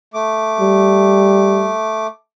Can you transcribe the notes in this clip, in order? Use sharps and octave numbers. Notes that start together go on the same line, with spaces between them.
A3 D6
G3